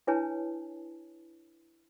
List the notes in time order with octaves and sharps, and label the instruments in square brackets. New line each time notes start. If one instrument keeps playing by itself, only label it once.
[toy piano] D4 E4 B4 C#5 G#5 A5